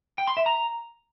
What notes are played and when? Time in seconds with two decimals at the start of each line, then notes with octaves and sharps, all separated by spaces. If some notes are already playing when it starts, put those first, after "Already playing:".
0.18 G5
0.27 C6
0.37 E5
0.46 A#5